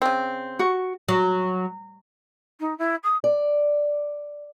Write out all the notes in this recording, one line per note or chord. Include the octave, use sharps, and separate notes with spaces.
C#3 C4
F#4 C#6
F#3
D#4
E4
D#6
D5